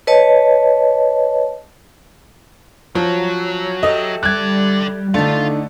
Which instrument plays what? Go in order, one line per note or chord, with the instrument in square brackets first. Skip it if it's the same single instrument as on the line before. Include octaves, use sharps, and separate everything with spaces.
[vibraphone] B4 C#5 D#5 A5
[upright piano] F3 [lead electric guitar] F#3 [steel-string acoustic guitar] C#4
[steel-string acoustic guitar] G4 A4 E5 [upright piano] D#5
[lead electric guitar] D3 D5 [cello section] G3 [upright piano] F#6 G#6
[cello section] D3 [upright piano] A3 [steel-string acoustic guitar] D4 D#4 [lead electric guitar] F4